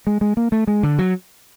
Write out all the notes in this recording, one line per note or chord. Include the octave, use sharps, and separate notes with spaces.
G#3
G#3
A#3
A3
G#3
D3
F#3